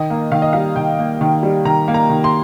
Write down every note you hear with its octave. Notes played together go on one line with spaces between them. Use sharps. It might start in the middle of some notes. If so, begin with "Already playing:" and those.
Already playing: D#3 D#5
A#3
D#3 F5
D#5
G3 F5
D#3 G5
A#3
D#3
G3
D#3 A#5
A#3
A#5
D#3
C6